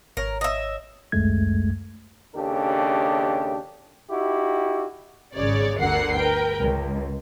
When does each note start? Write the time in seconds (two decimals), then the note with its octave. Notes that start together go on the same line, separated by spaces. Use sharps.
0.17 G#1 A#4 C#5
0.41 D#5 E5
1.12 G#1 C#2 F#2 G#3 A3 G#6
2.35 D#2 C#3 D4 G4 A4
4.10 D#4 E4 F#4 G4
5.34 G#1 C#3 C#5 D5
5.79 G1 D2 D3 A#4 F#5 C7
6.17 A#4 B4 G5
6.61 C#2